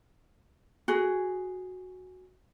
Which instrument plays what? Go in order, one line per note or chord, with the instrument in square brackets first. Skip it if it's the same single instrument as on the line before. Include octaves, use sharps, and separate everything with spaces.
[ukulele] F#4 G#4